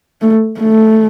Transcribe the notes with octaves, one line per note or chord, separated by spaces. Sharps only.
A3
A3